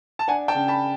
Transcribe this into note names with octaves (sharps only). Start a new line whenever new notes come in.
A5
D4 F#5 G#5
G5 A5
C#3
A5 B5